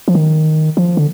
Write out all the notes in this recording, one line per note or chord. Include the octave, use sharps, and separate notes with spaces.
F3
D#3
F3
D3